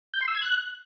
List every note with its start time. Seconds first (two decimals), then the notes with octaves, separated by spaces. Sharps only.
0.14 G6
0.21 C6
0.28 E6
0.35 G#6
0.42 F#6